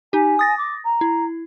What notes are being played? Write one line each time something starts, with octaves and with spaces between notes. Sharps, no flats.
D#4 G4 G#5
D#6 A6 A#6
D6
A#5
E4